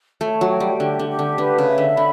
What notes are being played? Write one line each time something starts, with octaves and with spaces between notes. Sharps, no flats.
A3 C#5
F#3
G5
G3
D3 G4
D3
G4
D3
D3 B4
C#3
E5
D3
D3 B5